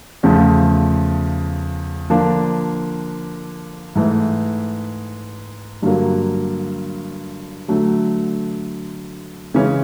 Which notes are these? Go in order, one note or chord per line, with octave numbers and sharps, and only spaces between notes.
E2 C#3 F3 A3
D3 F3 A#3 D4
G#2 E3 A3
G2 D3 F#3 A#3
D3 F#3 A3
C#3 E3 G#3 C#4